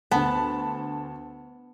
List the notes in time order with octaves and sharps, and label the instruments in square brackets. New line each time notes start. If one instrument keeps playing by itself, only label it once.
[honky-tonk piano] D2 A5 [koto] B3